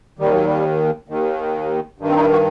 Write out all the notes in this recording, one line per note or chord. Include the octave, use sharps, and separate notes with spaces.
D#2 D#3 G3
F#3
G3
D#2 D#3
G2 D#3
C4
D#4
E4
F#4